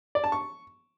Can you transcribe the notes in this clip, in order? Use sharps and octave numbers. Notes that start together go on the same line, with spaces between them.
D5
A5
C#6